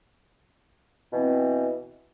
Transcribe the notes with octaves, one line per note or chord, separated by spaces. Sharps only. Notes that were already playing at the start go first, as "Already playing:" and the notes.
B2 E3 C4